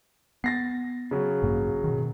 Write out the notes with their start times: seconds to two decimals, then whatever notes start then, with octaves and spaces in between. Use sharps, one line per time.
0.44 B3 A6 A#6 C7
1.11 C#3 F#3
1.42 A1 G2 A#3
1.84 B2 D#3